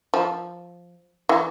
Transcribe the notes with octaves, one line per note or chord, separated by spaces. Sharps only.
F3
E3